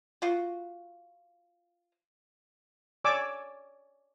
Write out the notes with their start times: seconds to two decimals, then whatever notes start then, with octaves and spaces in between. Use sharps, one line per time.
0.22 F4 F#4
3.04 C#5 D5 G#5 D6 E6